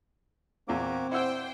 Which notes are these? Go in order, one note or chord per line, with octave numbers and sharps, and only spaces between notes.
E2 A#2 A#3 C4 F#4 D6
E4 C5 D5 F#5 G5 E6